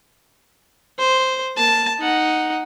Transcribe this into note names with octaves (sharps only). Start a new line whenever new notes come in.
C5
A#3 A5
D#4 F#5